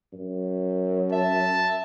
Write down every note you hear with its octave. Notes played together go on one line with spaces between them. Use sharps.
F#2
E5 A5